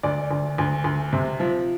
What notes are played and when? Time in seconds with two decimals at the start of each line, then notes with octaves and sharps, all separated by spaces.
0.03 D2 D5
0.31 D2
0.58 D2
0.84 D2
1.13 C3
1.40 F3